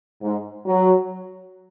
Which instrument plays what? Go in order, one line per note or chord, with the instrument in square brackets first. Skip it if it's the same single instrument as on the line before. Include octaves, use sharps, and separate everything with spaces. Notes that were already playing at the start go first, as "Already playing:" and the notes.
[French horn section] G#2
F#3